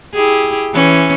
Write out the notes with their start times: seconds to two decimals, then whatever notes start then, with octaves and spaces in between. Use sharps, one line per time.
0.14 E4 G4 G#4
0.74 E3 C#4